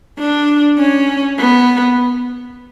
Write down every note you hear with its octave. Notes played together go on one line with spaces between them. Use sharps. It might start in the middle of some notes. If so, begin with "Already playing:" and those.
D4
C#4
B3